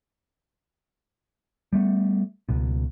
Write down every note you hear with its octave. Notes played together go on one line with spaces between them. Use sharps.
G3 A3 B3
C#2 B2